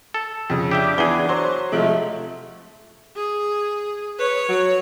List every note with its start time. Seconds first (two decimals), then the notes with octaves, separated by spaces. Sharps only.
0.14 A4
0.50 F2 C#3
0.71 D4 G4 E5 G5
0.98 E2 E3 G#4 G7
1.29 F#3 C5
1.72 C3 F3 G#3 A3
3.16 G#4
4.19 B4 C#5
4.48 F#3